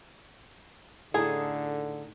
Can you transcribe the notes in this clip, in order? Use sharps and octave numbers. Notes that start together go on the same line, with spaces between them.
A2 D3 A3 D#4 G#4 A4 C#5 F5